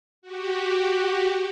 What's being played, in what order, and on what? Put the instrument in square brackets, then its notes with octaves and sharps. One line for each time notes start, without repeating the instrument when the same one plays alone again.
[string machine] F#4 G4